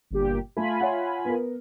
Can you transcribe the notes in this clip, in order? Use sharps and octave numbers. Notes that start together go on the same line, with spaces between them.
G1 A#2 G4
A3 F4 G#5 B5
C#5 E5 F#5
B3 A#4